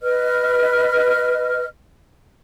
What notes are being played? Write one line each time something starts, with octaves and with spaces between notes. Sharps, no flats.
B4 D#5 F6